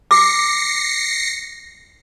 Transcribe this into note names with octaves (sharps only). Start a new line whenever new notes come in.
D6 A#6 C7 C#7